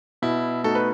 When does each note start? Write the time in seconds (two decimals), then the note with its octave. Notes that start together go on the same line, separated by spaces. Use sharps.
0.22 B2 E4
0.64 A3 D#4 F#4 A4
0.75 B4